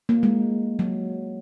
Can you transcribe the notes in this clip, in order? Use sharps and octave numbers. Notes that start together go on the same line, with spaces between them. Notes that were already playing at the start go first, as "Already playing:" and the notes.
A#3
G#3
F#3